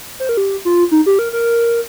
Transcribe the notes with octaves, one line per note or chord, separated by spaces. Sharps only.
C5
A#4
G4
F4
D#4
G4
A#4
A#4